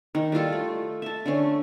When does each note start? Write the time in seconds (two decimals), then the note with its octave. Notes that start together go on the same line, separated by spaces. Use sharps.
0.15 D#3
0.32 G3 E4 F4 A4
0.52 A3
1.02 E5 A5
1.26 D3 A3 C#4